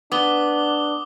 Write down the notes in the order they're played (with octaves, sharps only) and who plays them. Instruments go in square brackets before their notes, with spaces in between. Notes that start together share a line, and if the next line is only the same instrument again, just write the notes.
[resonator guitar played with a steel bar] B3 [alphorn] D4 [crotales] D6 D#6 G7